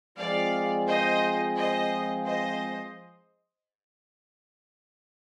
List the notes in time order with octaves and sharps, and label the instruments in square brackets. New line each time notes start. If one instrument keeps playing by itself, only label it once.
[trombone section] F3 G#3 C4 F4 G#4 [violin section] D5 F5
[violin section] C5 D#5
C5 D#5
C5 D#5